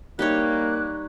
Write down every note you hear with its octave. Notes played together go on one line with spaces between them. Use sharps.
G3 A#3 D#4 C#5 F#6